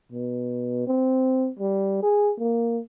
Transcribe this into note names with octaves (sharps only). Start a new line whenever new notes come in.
B2
C4
G3
G#4
A#3